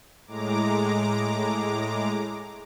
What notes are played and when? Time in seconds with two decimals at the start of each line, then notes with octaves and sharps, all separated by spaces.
0.27 A2 G#3 A#5 D6